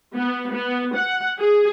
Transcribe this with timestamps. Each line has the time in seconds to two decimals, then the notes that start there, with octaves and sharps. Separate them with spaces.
0.16 B3
0.53 B3
0.96 F#5
1.39 G#4